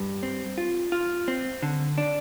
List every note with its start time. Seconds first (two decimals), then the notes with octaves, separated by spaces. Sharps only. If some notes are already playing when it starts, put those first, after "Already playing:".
Already playing: G2
0.23 C4
0.58 F4
0.92 F4
1.28 C4
1.62 D3
1.98 D4